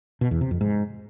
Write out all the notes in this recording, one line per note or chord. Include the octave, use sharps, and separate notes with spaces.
B2
E2
C3
F2
G#2